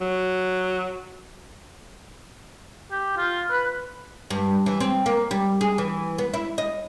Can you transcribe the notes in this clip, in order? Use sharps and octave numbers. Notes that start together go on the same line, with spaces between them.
F#3
G4
F4
B4
G2
E3
C4
A#3
G3
G#4
E3
B3
E4
D#5